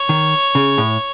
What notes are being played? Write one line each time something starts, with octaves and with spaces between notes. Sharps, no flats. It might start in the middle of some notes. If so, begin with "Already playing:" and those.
Already playing: C#5
D#3
C#3
A2